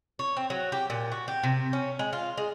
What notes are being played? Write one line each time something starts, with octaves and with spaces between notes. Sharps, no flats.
C#5
C4
F#3
G4
A#2
F#4
G4
C3
C#4
G#3
F4
G#3